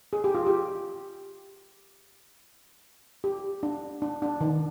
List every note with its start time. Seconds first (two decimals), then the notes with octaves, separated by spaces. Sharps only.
0.13 G#4
0.24 G4
0.35 F4
0.47 G4
3.24 G4
3.63 D4
4.02 D4
4.22 D4
4.41 D#3